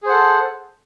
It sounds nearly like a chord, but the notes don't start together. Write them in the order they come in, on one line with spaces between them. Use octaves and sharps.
G#4 C5 F#5 A4